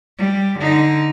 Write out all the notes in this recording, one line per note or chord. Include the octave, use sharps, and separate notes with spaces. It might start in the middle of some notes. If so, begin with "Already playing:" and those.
G3
D3 D#4